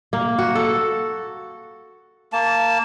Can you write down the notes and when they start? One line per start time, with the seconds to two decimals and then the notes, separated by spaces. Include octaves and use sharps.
0.13 A#3
0.38 F#4
0.55 A4
2.33 A#3 A5